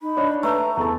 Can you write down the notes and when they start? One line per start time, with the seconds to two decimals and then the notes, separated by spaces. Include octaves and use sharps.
0.01 D#4 B5
0.17 D4 C#5 D#5
0.43 A3 B4 A#5
0.77 E2 A4 A5